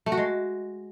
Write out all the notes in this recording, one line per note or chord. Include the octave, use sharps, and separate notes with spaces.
A3
F#4
G#3